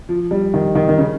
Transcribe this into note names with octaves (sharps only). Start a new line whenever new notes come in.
F3
G3
D#3
D#3
D#3
C#3